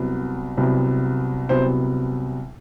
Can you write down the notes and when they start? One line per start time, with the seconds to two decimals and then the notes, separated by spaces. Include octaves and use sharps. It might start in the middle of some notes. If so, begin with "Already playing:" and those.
Already playing: C2 C3 F#3 B3
0.57 C2 C3 F#3 B3
1.49 C2 C3 F#3 B3 C5